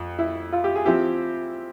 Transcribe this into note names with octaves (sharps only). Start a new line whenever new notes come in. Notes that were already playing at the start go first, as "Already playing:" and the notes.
Already playing: F2
E4
F4
G4
G#4
F3 C4 E4 G4